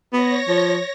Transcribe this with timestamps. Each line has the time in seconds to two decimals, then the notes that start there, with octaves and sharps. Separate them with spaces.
0.13 B3 C#5 A#6
0.48 F3